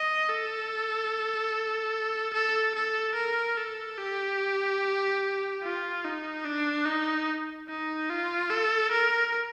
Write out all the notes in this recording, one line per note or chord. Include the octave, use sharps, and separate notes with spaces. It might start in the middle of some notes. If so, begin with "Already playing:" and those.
Already playing: D#5
A4
A4
A4
A#4
A4
G4
F4
D#4
D4
D#4
D#4
F4
A4
A#4